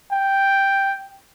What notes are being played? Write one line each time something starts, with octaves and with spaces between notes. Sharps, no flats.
G5